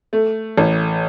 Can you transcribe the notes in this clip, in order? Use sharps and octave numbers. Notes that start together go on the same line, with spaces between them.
A3
A1